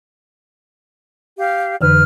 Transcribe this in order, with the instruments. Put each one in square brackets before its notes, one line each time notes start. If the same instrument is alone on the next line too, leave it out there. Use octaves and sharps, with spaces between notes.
[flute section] G4 F5
[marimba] F2 D3 E3 [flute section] B4 F6